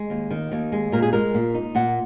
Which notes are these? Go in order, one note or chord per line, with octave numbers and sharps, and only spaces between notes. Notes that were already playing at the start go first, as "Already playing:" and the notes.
Already playing: G#3
D#2
D#3
D#2
G#3
A#2 A#4
G#4
G#3 A#4
A#2
D#4
A#2 F#5